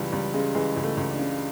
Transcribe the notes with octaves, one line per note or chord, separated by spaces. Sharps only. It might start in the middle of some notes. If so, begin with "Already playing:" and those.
Already playing: C#2 E3 G3
C#2 G3
C#3 G#3
E3 G#3
C#2
A3
C#2
D4
C#3